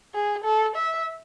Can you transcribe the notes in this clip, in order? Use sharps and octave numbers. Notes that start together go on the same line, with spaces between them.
G#4
A4
E5